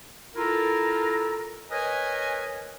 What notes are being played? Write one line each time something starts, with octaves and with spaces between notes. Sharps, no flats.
E4 F4 A4 A#4
A#4 B4 C#5 D#5 G#5